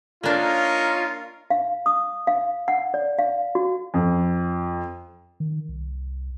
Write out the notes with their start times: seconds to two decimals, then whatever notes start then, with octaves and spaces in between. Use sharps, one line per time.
0.23 A#3 D4 D#4 F4 A#4 C#5
1.50 F5
1.86 D#6
2.27 F5
2.68 F#5
2.94 D5
3.19 F5
3.55 F#4
3.94 F2
5.40 D#3
5.69 C2